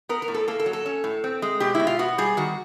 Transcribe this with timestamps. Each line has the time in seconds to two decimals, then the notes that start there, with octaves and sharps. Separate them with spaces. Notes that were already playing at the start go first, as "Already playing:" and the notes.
0.09 B3 A#4
0.22 A#4
0.28 A2
0.34 A4
0.48 A#3 A4
0.59 A4
0.66 F#3
0.73 A4
0.86 C#4
1.04 A2
1.24 C4
1.42 G#3
1.60 B2 G4
1.75 E4
1.80 B2
1.87 F4
1.99 B3 F#4
2.18 G3 G#4
2.37 D#3 F#4